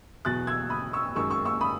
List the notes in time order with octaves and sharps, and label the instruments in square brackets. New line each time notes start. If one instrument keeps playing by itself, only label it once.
[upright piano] E2 B2 F#3 F#6 A6
E6 G#6
B5 D#6
C#6 E6
F#2 D#3 G#3 C#6 E6
C#6 E6
C#6 E6
B5 D#6